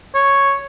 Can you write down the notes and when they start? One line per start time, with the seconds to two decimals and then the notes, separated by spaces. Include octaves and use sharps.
0.15 C#5